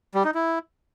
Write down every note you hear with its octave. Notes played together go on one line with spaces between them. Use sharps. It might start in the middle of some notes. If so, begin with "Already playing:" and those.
G3
D#4
E4